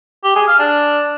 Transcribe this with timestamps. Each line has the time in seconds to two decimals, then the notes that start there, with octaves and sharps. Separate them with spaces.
0.24 G4
0.36 G#4
0.47 F5
0.59 D4